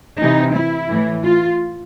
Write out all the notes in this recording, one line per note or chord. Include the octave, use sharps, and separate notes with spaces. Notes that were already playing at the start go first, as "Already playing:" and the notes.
C3 E3 D#4
E4
A2 E3
F4